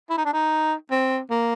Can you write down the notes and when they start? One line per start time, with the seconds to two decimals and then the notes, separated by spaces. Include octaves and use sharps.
0.10 E4
0.18 D#4
0.25 D4
0.33 D#4
0.91 C4
1.30 A#3